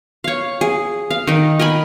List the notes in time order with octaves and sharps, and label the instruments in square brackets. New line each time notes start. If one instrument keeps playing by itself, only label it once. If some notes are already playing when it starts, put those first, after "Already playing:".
[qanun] C#5 F5
G#4
F5
D#3 D#4
A#4 D#5 G#5 B5